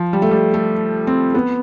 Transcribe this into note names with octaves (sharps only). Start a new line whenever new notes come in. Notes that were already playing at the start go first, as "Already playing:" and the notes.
Already playing: F3
G3
A3
G3
A3
C4
B3